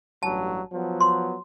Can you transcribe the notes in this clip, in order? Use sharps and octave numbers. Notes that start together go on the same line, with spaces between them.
A1 G2 F#3 A5
F3 F#3 B3
C6